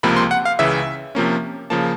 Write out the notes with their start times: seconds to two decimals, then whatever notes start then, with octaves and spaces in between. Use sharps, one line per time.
0.03 C#2 C3 F3 A#3 B5
0.17 C6
0.31 F#5
0.45 F5
0.59 C#2 C#3 E3 E5
1.15 C3 F3 A#3 C#4
1.70 C#3 F3 A#3 A5